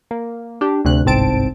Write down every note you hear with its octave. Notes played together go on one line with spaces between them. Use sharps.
A#3
D4 G4
D2 C3 F#6
G1 C2 G#2 C4 A5 D7